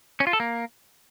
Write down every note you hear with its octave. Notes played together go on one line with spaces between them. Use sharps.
C#4
F4
A4
A#3